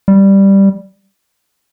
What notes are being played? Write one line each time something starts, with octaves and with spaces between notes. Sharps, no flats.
G3